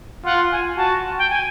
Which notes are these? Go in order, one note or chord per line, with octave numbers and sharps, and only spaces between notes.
F4 F#5
G#5
F#4 A5
G5
G#5